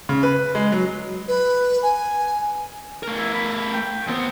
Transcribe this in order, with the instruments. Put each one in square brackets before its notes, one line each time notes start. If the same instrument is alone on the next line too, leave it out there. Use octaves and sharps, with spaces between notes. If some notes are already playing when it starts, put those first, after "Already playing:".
[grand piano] C#3
B4
G#3
F#3
[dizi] B4
G#5
[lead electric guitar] A3 A#4
[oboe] E4
B5
G5
[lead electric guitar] D#2 B3 [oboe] C4